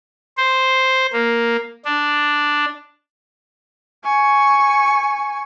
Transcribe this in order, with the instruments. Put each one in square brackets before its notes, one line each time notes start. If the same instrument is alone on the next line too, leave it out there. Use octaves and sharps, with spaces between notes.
[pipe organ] C5
A#3
D4
[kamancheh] G#5 C#6